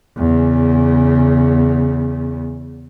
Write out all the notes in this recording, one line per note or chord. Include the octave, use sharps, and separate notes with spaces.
E2 C#3